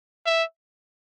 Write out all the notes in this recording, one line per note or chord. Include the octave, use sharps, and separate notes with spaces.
E5